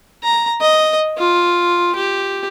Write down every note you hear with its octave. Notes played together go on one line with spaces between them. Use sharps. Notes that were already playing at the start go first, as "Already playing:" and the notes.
A#5
D#5
F4
G4